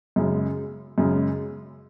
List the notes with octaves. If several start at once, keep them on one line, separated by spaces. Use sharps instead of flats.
F#2 C#3 G#3
F#2 C#3 G#3